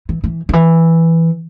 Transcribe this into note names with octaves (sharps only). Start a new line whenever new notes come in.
E3
E3
D#3
E3